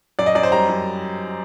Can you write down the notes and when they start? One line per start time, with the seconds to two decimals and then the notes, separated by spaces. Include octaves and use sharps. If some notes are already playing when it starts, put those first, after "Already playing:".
0.19 F#2 D5
0.26 D#5
0.35 F#2 D5
0.43 C5
0.52 G3 A#5
0.69 F#2